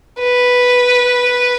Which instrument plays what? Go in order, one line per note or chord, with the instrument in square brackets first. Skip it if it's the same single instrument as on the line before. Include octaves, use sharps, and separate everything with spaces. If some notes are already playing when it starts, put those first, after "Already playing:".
[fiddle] B4